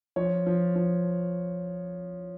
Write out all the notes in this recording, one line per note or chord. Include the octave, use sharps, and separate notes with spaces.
F3 C#5
F3
F3